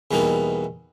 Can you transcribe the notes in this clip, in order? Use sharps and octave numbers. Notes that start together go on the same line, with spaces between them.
E2 B2 E3 G3 A#3 D#4